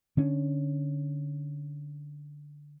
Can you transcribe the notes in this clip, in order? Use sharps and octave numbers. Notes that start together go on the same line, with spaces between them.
D3 C#4 D4